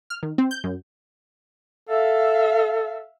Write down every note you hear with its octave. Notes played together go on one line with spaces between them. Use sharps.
F6
D#3
C4
G6
F#2
A4 E5 F5